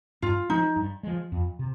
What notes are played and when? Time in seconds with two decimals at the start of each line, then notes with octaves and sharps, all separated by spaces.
0.22 G2 F4
0.49 F3 G#3 D#4
0.76 G2
1.03 F3 G#3
1.32 F2
1.59 C3